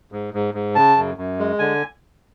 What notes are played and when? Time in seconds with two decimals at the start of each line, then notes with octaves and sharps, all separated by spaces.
0.12 G#2
0.34 G#2
0.54 G#2
0.75 C#3 A5
0.97 F#2
1.17 F#2
1.39 G#3
1.59 D3 G#5